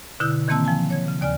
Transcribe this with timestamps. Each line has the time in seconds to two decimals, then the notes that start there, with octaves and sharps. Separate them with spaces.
0.20 B2 D3 E4 E6 F#6 G6
0.48 D#3 E3 A#3 C4 A5 E6
0.65 F3 G#5 A5
0.90 C#5 G#6
1.08 C#3
1.21 D#2 D5 G#5 F6